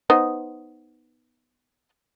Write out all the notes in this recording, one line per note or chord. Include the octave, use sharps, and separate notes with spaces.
B3 D#4 C5